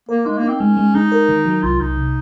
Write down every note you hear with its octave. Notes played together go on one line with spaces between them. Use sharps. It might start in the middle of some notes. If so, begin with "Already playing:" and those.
A#3 A#4
G#3 D#4
A#3
D#4
C4
G#3 C#4
G#3
G#3 D#4
A#4
D#3
F#3
C2 F4
C2 D#4
C3